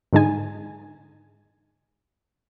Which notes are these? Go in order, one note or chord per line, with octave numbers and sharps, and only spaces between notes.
G#2 D3 G#3 D#4 G#5